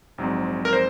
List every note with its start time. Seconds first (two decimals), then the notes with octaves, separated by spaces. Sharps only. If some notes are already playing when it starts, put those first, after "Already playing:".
0.18 A#1 G#2 F#3 C4
0.65 A#4
0.73 C5